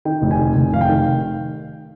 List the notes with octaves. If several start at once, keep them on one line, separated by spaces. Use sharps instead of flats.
D#3 G5
F1
G#5
D#3
F1
F1 F5
G5
D#3